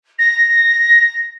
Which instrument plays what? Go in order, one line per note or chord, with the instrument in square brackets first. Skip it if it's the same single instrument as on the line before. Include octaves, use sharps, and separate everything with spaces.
[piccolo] A#6